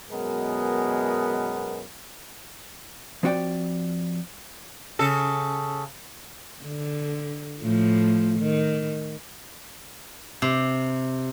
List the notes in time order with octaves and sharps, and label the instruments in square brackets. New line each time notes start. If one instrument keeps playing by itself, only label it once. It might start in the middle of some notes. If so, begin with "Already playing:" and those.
[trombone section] F#2 B2 G#3 B3 A#4
[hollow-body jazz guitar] F3 C4 F#4 D5 G5
[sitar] C#3 A4
[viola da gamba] D3
A2 F3
D#3
[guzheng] C3